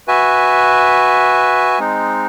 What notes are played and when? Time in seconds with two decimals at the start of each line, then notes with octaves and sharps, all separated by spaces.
0.08 F#4 B4 E5 G#5
1.79 G#3 C4 D#4